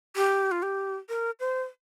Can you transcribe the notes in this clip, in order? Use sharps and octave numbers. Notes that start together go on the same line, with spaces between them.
G4
F4
G4
A#4
C5